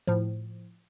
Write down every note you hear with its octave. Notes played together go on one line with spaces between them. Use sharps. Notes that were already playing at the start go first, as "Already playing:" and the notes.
A2 F3